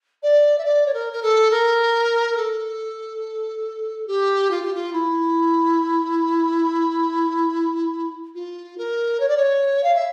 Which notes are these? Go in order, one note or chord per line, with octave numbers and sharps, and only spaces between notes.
D5
E5
D5
C#5
A#4
A#4
A4
A#4
A4
G4
F4
G4
F4
E4
F4
A#4
C#5
D5
C#5
F5
E5